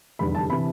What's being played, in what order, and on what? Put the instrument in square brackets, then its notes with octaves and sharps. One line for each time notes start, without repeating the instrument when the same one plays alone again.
[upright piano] F1 E2 D3 G3 B3 B5
A5
C3 E3 B5